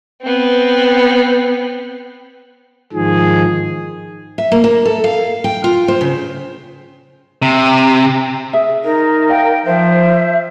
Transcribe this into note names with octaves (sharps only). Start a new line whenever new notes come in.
B3 C4
G#2 D#3 F3 G#4
E5
A#3
A#3
A4
F5
G5
F4
C5
C#3
C3
G#4 E5
D#4 A#4
D5 F5 G5
F3 C5 E5